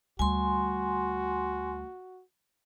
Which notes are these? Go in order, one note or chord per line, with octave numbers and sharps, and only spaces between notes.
D2 G3 F#4 G#5 C6